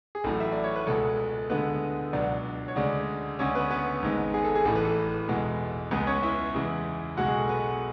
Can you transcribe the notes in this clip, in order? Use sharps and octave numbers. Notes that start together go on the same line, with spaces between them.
G#4
A1 A2 F#3 A4
E5
D5
C#5
B4
C#2 B2 G#3 A4
D2 D3 G#3 B3 B4
C#2 B2 F#3 D4 D5
C#5
D2 C#3 G#3 D4 D5
D2 C#3 G#3 C#4 C#5
B3 B4
B3 B4
G#1 G#2 G#3
G#4
A4
G#4
A1 A2 E3 A4
B4
A4
E2 B2 G#3
C#2 C#3 G#3 B3 B4
C#4 C#5
E4 E5
E2 C#3 E3 G#3
B1 B2 G#3 F#4 F#5
G#4
A4
B3 B4